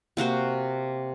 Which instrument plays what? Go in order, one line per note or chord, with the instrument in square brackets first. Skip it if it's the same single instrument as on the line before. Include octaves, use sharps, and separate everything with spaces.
[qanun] C3 A#3 F#4 C5